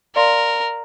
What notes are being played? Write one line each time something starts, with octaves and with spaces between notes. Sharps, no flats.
A#4 D5 F5 C6